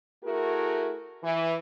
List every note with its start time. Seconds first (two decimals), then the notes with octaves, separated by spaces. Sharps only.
0.24 A3 E4 F#4 G#4 A#4
1.23 E3